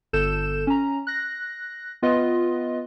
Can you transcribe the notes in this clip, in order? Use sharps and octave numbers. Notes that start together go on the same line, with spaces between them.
G1 A4 G6 E7
C#4 A#5
F#6 A#6
B3 F4 B4 D#5